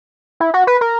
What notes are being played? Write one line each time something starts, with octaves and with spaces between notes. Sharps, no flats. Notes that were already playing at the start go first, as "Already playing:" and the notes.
E4
F#4
B4
A#4